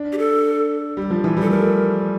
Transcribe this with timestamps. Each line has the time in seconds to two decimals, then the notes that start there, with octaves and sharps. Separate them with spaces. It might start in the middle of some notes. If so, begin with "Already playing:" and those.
Already playing: D4
0.13 G4
0.18 A4
0.97 G3
1.11 F3
1.24 E3
1.37 G3 A4
1.50 A3 A#4